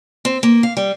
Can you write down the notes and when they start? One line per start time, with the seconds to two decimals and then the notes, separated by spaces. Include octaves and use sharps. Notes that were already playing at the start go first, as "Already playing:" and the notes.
0.25 C4
0.43 A#3
0.63 F5
0.77 G3